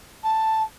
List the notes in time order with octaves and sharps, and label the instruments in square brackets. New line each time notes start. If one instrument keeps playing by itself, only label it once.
[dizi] A5